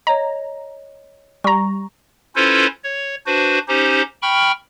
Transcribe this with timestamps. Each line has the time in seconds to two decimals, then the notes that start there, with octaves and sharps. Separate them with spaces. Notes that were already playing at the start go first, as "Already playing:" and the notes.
0.07 C#5 D#5 A#5
1.44 G3 A#5 C#6
2.36 C#4 E4 F4 A4 B4 C5
2.84 C#5
3.26 D4 F#4 B4 C5
3.68 C#4 D#4 G4 C5
4.22 G5 B5 C#6 F6